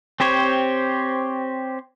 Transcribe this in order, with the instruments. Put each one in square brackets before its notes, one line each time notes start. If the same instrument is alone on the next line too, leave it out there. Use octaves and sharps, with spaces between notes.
[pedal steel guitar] C4 G4 C5 C#5